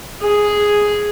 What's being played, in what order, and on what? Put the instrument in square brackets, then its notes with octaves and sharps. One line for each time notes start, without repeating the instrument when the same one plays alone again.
[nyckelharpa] G#4